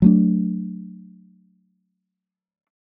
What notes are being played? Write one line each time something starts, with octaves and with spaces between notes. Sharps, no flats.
F#3 A3 D4